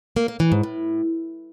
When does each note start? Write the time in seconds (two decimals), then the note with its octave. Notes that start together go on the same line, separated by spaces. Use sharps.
0.16 A#3
0.28 A#3
0.40 E3
0.52 G#2
0.63 A2